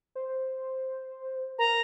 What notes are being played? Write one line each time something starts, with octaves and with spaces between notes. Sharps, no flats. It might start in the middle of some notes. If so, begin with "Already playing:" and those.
C5
A#4 A#5